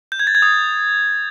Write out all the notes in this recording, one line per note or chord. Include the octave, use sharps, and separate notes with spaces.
G6
G#6
A6
G#6
D#6